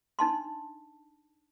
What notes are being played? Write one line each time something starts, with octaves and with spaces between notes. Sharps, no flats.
D4 D#4 A5 C6